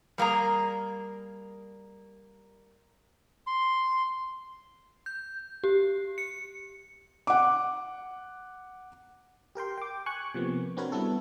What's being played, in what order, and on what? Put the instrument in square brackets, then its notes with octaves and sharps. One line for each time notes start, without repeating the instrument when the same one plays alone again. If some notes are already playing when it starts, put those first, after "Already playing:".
[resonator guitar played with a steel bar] G3 A#3 G#4 A#5
[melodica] C6
[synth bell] G6
G4
C#7
[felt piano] F#5 D6
[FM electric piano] G4 A#4 G5 C6
G5 D6
G#5 C#6 F#6
C3 F3 A#3 B3
C4 D4 F#4 A#4 B4 C#5
G3 B3 E4 A4